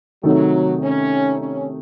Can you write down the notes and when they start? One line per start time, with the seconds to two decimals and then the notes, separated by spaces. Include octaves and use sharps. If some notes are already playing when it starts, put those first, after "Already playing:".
0.23 C3 D#3 F#3 A3 D#4 A4
0.82 C#4
1.39 C#4